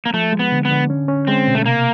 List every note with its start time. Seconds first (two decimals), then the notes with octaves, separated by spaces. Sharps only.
0.06 A#3
0.14 F3 A3
0.32 G#3
0.39 B3
0.52 D3
0.65 B3
0.71 D3
0.90 C#4
1.08 C#4
1.27 G#3 C4
1.47 B2
1.55 A3
1.65 C3 A#3